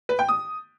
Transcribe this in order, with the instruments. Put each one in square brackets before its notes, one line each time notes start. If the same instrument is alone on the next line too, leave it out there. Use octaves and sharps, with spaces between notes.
[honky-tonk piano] B4
G5
D#6